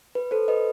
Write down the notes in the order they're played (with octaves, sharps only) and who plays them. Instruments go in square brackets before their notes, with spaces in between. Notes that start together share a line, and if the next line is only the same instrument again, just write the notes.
[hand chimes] B4
A4 C5
B4 D#5